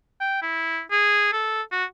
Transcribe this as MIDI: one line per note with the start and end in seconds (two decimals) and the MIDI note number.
0.21 0.41 79
0.42 0.80 64
0.91 1.31 68
1.32 1.62 69
1.72 1.84 66